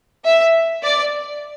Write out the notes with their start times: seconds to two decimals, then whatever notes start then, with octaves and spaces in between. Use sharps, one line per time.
0.25 E5
0.83 D5